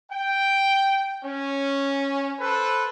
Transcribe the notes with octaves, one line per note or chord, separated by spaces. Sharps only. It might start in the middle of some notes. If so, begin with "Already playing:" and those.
G5
C#4
A4 B4 C5